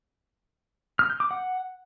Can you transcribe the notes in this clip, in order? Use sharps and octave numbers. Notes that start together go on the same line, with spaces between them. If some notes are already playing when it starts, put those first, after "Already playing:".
F6
G6
D6
F#5